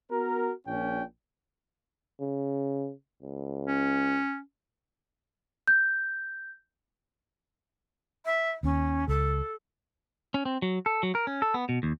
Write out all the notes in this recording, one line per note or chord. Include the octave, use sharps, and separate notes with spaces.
B3 F#4 A#4
A#1 A#2 C#4 G5
C#3
C#2
C#4
G6
E5
D#2 C#4
C#2 A4
C#4
C4
F#3
A4
F#3
A#4
C#4
A4
B3
B2
D#2